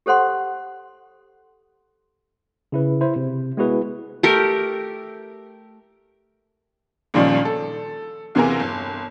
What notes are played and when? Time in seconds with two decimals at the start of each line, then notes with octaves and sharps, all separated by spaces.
0.06 G4 A4 C5 F#5 C6
2.72 C#3 E4 B4
3.01 E4 C5
3.16 C3
3.57 G#3 B3 E4 F#4 G#4 B4
4.23 A3 G4 A#4
7.14 C#2 A#2 D#3 F3 G3 C#4
7.45 A4
8.35 E2 C3 E3 A#3 G#4 A#4
8.60 G1